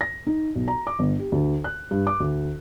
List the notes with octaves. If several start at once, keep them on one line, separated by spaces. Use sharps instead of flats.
A#6
D#4
B1
A#5
D6
G1
G4
D2
F#6
G2
D6
D2